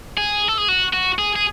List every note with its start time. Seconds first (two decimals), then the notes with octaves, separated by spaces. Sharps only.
0.17 G#4
0.48 A4
0.58 G#4
0.68 F#4
0.93 F#4
1.19 G#4
1.36 G#4